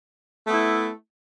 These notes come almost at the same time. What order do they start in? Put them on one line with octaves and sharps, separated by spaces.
A3 B3 E4